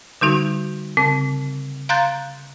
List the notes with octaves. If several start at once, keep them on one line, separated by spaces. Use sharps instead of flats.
D3 G3 D#4 F#4
C#3 C4
F5 A#5 C6 F#6 G6 A6